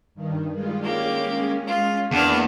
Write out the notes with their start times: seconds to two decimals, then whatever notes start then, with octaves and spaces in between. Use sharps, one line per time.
0.15 G2 D#3
0.53 G3 G#3 F4
0.82 G#3 A#3 C#4 G4
1.67 F4
2.11 E2 A#3 D4 B4 F6